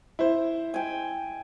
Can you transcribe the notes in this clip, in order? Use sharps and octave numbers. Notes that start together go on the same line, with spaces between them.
E4 C5
G5 G#5